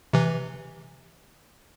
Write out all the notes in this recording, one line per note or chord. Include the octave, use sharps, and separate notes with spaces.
C3 E3